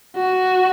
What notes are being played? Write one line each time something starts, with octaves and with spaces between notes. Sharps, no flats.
F#4